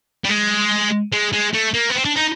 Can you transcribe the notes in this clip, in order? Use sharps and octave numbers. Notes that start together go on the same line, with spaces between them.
G3
G#3
G#3
G#3
A3
A#3
B3
C4
D4
D#4